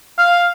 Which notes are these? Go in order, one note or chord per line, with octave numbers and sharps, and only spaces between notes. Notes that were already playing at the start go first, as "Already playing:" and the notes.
F5